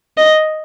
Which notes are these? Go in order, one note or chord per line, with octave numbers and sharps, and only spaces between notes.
D#5